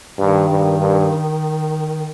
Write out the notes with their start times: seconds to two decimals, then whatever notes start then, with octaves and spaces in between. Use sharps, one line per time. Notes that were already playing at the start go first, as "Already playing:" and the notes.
0.18 G2 D#3
0.49 G2
0.80 G2